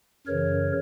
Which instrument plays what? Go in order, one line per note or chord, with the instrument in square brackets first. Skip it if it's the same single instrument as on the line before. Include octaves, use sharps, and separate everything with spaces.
[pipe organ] F#2 C#3 E3 A#4 C#5